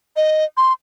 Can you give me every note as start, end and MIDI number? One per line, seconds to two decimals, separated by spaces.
0.16 0.45 75
0.57 0.73 84